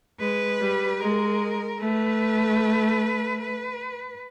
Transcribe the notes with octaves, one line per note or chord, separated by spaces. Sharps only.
G#3 B4
G3
G#3 A#4
A3 B4
B4